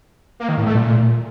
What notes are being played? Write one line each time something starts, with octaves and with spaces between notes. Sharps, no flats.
A#3
D#3
A2
A3
A#2